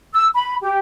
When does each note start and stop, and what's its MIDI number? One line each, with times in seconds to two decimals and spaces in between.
0.13 0.27 88
0.34 0.54 83
0.62 0.78 67